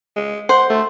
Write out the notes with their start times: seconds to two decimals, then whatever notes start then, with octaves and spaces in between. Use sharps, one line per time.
0.16 G#3
0.49 C5 F#5
0.70 A3